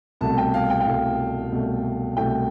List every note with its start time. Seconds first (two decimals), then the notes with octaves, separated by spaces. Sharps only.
0.21 C2 B2 A3 A5
0.38 G5
0.54 F5
0.70 G5
0.80 G5
0.86 C2 B2 A3 F5
1.52 C2 B2 A3
2.17 C2 B2 A3 G5